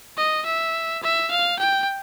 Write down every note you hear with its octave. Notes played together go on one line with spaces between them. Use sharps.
D#5
E5
E5
F5
G5